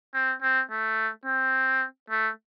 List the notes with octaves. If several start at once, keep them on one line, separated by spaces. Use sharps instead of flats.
C4
C4
A3
C4
A3